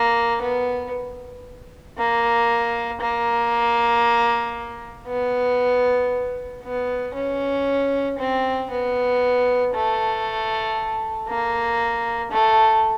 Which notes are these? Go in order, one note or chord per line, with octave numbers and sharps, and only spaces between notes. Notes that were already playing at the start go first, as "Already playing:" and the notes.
Already playing: A#3
B3
A#3
A#3
B3
B3
C#4
C4
B3
A3
A#3
A3